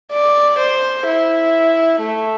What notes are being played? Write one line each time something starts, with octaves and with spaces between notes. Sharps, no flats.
D5
C5
E4
A3